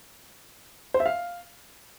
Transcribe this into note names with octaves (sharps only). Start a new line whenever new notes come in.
C5
E5
F5